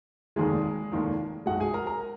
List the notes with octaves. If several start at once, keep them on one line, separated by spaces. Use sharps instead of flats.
F1 D#2 D#3 G#3 A#3 G#4
F1 D#2 D#3 A#3
B1 B2 G#3 F#4 F#5
G#4 G#5
A#4 A#5
A#4 A#5